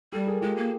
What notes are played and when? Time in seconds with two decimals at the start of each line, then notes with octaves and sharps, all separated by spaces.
0.12 G3 G4 A4
0.27 G#4 A#4
0.41 G#3 F4 G4
0.56 A#3